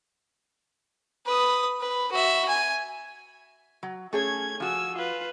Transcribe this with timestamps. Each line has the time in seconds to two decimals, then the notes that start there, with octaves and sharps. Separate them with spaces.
1.26 B4 D#6
1.80 B4
2.11 F#4 E5
2.48 G#5
3.83 F#3
4.13 A3 C#4 G#4 C#5 G#6
4.60 F3 F#4 G#5 E6
4.96 F4 B4